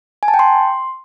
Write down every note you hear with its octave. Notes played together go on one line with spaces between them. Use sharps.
G#5
A5
G5
C6